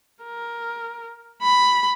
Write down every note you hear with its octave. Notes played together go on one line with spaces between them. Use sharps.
A#4
B5